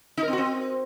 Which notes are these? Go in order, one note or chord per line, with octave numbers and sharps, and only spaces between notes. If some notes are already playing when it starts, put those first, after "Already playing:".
D#4
A#4
C4
F#4
C4